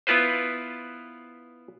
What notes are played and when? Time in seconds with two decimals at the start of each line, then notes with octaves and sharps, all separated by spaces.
0.07 B3 E4 F4 B4 C5